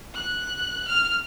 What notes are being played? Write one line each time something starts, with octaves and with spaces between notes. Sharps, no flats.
F#6
F6